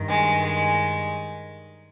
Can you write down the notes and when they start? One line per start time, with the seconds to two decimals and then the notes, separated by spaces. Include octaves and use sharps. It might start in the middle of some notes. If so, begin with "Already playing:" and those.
Already playing: G2 D#3
0.09 G#3
0.43 G#3